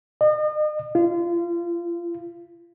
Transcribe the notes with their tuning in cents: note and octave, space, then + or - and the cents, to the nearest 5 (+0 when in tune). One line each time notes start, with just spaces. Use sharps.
D#5 -40
F4 -30